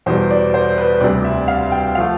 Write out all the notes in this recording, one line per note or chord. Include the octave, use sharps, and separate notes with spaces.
E2 B2 G3 C5
D5
C5
B4
D2 C3 G3 D5
E5
F5
G5
F3 A3 F5